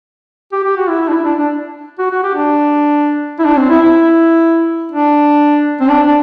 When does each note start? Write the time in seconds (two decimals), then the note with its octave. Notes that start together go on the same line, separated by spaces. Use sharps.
0.53 G4
0.64 G4
0.77 F#4
0.89 E4
1.01 E4
1.09 D4
1.13 E4
1.25 D4
1.38 D4
1.99 F#4
2.11 F#4
2.23 G4
2.35 D4
3.39 E4
3.45 D4
3.57 C4
3.70 E4
3.82 E4
4.92 D4
5.81 C4
5.89 D4
6.06 D4